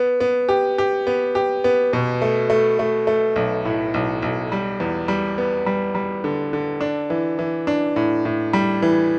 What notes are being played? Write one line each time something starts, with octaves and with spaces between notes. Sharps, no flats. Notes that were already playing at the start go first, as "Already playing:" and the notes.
Already playing: B3
B3
G4
G4
B3
G4
B3
B2
A3
A3
A3
A3
B1
A2
B1
B1
G3
E2
G3
B3
G3
G3
D3
D3
D4
E3
E3
D4
A2
A2
G3
E3